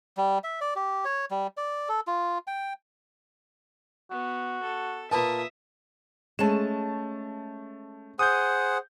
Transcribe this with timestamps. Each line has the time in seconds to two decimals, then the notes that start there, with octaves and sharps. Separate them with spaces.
0.17 G3
0.44 E5
0.61 D5
0.75 G4
1.05 C#5
1.31 G3
1.57 D5
1.89 A4
2.07 F4
2.47 G5
4.11 B3 F#4
4.62 A4
5.11 A#2 A#3 B4 E5 A5 D#6
6.39 G#3 A3 C#4 A5 E7
8.19 G#4 C5 F#5 D#6 G6